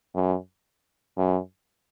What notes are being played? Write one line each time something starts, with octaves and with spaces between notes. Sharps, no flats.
F#2
F#2